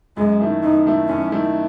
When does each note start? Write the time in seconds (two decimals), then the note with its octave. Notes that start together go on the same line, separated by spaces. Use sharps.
0.17 F#2 G#3
0.40 D#3 A3 E4
0.63 F#2 D#4
0.85 D#3 A3 E4
1.08 F#2 C#4
1.32 D#3 A3 E4